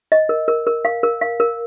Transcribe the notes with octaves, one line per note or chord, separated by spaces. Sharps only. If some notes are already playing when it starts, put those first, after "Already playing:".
D#5
A#4
A#4
A#4
F5
A#4
F5
A#4